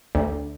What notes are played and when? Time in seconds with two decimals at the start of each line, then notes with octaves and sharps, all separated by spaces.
0.15 D2